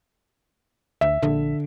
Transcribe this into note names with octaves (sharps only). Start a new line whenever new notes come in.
D2 E5
A#1 D3